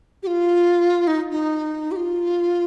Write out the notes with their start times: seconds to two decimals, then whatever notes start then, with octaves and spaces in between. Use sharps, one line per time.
0.23 G4
0.27 F4
1.07 D#4
1.31 D#4
1.92 G4
1.96 F4